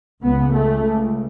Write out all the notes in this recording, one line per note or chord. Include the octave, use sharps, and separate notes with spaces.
C#2 C#3 B3
A3